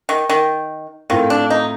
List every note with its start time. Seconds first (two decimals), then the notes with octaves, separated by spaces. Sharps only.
0.09 D#3
0.29 D#3
1.10 A2 D#3 A3 C4 F4 A4
1.30 D4
1.50 D#4